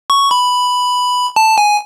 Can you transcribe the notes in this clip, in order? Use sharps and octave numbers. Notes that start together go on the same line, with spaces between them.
C#6
B5
A5
G#5